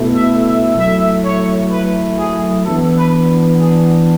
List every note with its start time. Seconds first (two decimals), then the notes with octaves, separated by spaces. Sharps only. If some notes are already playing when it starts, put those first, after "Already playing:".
Already playing: B2 A3 E4
0.14 E5
0.45 E5
0.76 F#3 A3 E4 E5
1.24 C#5
1.71 B4
2.18 G#4
2.65 E3 B3 D4 A4
2.97 B4
3.59 G#4